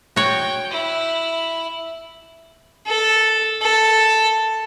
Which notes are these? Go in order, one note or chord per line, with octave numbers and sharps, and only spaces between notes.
F#4 C#5 G5
E4 B5
A4
A4